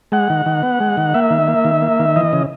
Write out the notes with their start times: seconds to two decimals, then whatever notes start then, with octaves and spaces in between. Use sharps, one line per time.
0.12 G#3 F#5
0.30 D#3
0.46 D#3
0.63 B3
0.80 G#3
0.97 D#3
1.14 A#3 E5
1.30 D#3
1.48 A#3
1.65 D#3
1.82 A#3
2.00 D#3
2.16 E3 D#5
2.33 C#3